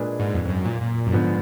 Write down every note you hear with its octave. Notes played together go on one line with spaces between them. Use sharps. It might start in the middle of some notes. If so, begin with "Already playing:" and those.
Already playing: A#2 G#3 D4 G#4 B4
G#2
F2
F2
F#2
A#2
A#2
F#2
G#2 D3 F3 B3 D4